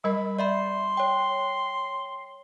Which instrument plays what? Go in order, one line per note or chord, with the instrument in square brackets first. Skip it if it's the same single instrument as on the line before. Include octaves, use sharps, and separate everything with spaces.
[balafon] G3 A#4 D#5 [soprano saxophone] B5
[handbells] D5 E5 B5 [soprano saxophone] C6
[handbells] C#5 G5